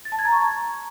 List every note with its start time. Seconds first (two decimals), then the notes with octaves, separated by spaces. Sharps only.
0.05 A6
0.12 A5
0.19 G#6
0.25 A#5
0.32 C#6